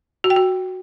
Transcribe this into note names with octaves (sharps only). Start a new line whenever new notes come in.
F#4
G5
F#4